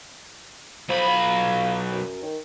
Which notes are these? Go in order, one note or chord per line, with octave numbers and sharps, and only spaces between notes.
B1 F3 B5
F4
F#2
D#3